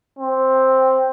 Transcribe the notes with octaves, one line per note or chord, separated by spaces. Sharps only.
C4